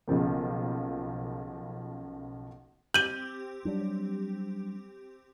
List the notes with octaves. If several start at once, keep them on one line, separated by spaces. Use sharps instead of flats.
B1 C#3 F3 A#3
C4 G4 G6 D#7 F#7
F#3 G3 D4